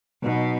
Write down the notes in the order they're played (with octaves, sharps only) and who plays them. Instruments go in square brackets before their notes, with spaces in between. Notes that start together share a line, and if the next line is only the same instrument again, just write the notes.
[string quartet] B2 [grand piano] F#3 B3 D#4 F#4